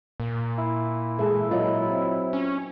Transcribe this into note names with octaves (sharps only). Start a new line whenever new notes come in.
A#2
E4
E3 G#3 G#4 A4
F#3 A#3 F4 D#5
C4
C#4